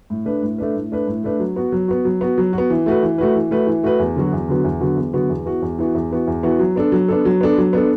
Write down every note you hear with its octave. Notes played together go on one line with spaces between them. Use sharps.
A2
A3 D4 B4
A2
A3 D4 B4
A2
A3 D4 B4
A2
A3 D4 B4
F#3
B3 F#4
F#3
B3 F#4
F#3
B3 F#4
F#3
F#4
B3
E3
A3 F#4 B4
E3
A3 F#4 B4
E3
A3 F#4 B4
E3
A3 F#4 B4
E2
D3 F#3 B3 F#4
E2
D3 F#3 B3 F#4
E2
D3 F#3 B3 F#4
E2
D3 F#3 B3 F#4
E2
E3 B3 F#4
E2
E3 B3 F#4
E2
E3 B3 F#4
E2
E3 B3 F#4
F#3
B3 D4 A4
F#3
B3 D4 A4
F#3
B3 D4 A4
F#3
B3 D4 A4